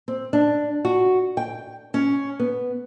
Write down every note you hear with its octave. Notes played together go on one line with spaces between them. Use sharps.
C4
D4
F#4
G5
C#4
B3